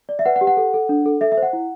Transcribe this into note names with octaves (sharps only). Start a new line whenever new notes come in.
D5
E5
B4 F#5
F#5
G4
F#5
A4
A4
D4
A4
A4 E5
E5
C5
F#5
E4